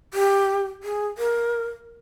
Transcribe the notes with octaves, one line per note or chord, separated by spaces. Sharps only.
G4
G#4
A#4